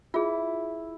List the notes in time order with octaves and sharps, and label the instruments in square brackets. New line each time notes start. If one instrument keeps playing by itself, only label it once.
[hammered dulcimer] E4 [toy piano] F4 G#4